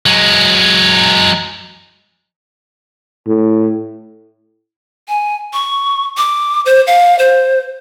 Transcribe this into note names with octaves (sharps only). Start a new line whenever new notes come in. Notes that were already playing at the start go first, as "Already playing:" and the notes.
F#3 G#3
A2
G#5
C#6
D6
C5
F5
C5